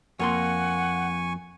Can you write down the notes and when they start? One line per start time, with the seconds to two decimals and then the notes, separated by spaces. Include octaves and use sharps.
0.19 F2 A#3 F#5 G#5 C6 C#6